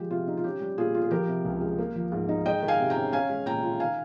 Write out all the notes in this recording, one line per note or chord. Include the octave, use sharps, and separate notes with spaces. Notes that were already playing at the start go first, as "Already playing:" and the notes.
Already playing: F3 G#3 G4
C3 F4
D#4
F4
C#4 G4
G3
A#2 F4 G#4
F4
G#4
F3 G4 A#4
C3
C#2
G#3
A#3
F3
G#2
D#4
G#3 D#5 G5
D#3
F5 G#5
C3
G5 A#5
C#4
C#4 F5 G#5
G#3
A#2 G5 A#5
F4
D#3 F5 G#5